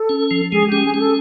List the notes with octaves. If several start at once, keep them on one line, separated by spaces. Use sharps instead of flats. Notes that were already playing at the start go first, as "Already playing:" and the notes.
Already playing: A4
C#4
F3
G#3 G#4
G4
C#4
G#4
C#4 G#4 A4